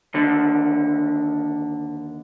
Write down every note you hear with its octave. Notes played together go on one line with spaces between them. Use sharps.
D#2 D3